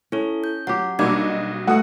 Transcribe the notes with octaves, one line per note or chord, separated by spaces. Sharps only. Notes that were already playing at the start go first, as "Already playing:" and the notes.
C#4 E4 A4
G6
F#3 F4 G4 F#5
B1 G3 A#3 C4 D4 F#4 D#5 G#6
A3 F#4 F#5 D#6